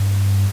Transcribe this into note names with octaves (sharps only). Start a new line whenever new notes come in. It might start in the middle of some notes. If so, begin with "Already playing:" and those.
Already playing: G2